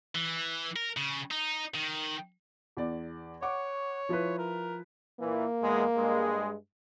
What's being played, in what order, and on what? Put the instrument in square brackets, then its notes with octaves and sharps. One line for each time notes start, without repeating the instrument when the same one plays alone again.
[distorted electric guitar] E3
A#4
C#3
D#4
D#3
[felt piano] E2 D5
[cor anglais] C#5 [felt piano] F#5 C#6 D6
[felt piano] F3 E4 B4
[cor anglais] A#4
[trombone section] A#2 E3 [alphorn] A#3
[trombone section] E2 G#3
G2 G#3